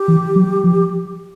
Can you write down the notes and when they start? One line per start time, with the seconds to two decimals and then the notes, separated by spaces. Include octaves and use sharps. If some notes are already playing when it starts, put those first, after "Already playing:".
Already playing: G4
0.08 E3
0.36 F#3
0.64 F3